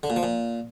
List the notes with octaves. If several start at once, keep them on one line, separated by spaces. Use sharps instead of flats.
D3
A#2
F3
A#2